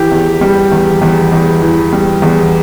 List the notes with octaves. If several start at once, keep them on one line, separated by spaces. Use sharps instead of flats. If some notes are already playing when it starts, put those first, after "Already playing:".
Already playing: E3 G4
E2
G3
E2
E2
E2
E3
G3
E2